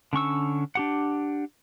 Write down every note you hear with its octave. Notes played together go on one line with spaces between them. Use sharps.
D3 C#4 C#6 E6
D4 G4 F#5